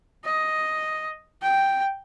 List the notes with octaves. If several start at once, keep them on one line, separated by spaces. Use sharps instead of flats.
D#5
G5